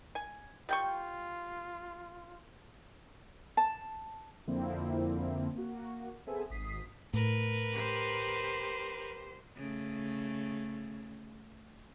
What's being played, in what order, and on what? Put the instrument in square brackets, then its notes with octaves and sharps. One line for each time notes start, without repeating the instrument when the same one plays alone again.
[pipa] G#5
[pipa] G3 G5 C#6 [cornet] F4
[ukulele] A5
[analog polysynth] F2 D3 F3 A#3 C4 E4
A#3 F#4
B3 C4 G#4 A4 E5 G#5
G#1 D#6 B6 C7
[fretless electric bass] A2 [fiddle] A#4 B4
[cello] G4 C5
[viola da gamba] C#3 A3